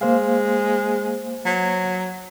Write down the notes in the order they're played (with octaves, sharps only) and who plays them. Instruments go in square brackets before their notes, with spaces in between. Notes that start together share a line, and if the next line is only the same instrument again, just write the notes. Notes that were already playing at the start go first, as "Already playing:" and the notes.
[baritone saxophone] G#3 [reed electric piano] A#3 C5 F5
[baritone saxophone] F#3